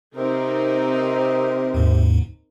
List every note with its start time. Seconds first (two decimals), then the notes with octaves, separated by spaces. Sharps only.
0.15 C3 C4 D#4 A#4
1.74 D#2 G#2